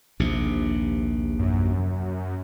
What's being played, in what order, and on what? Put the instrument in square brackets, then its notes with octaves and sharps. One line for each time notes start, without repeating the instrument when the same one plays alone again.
[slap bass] A#1 D#2 C3
[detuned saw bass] F#2